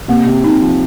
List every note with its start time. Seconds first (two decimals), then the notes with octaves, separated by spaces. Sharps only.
0.08 C3 A#3
0.26 C3
0.44 C3 D#4
0.62 F3